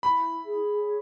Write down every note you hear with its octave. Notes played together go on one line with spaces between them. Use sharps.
E4 B5
G#4
C#5